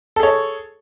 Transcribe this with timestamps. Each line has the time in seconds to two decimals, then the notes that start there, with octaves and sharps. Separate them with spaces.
0.16 A4
0.20 G#4
0.23 C#5